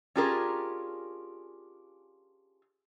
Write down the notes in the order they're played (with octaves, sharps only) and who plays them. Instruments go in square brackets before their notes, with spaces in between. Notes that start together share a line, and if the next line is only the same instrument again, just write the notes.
[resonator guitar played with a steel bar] C#4 D4 F4 G4 G#4 A#4